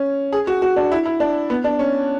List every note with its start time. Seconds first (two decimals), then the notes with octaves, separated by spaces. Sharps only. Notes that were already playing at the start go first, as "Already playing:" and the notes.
Already playing: C#4
0.33 G#4
0.47 F#4
0.62 F#4
0.76 D4
0.92 E4
1.06 E4
1.20 D4
1.50 B3
1.64 D4
1.79 C#4